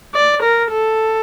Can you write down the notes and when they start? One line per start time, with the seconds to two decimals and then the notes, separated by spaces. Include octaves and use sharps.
0.15 D5
0.42 A#4
0.71 A4